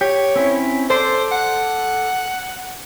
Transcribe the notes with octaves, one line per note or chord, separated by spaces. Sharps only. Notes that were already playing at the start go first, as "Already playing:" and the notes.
G4 C#5
C4 C#4 E4
A4 C5 D5 C6
F#5